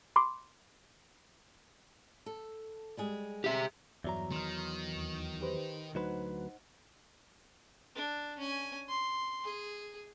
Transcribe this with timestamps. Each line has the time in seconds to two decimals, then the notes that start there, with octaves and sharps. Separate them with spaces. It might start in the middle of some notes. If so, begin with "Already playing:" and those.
0.16 B5 C6 D6
2.26 A4
2.97 G3 G#3 G#4
3.44 G4 E5
4.04 E2 G2 F#3 D5 E5 A#5
4.32 D#3 C6 F6
4.95 D#2
5.41 G4 B4 C5
5.95 D2 F#3 D#4 B4 C5 F#5
7.96 D4
8.39 C#4 G#5
8.88 C6
9.44 G#4